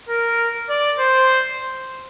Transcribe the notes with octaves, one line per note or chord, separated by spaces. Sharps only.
A#4
D5
C5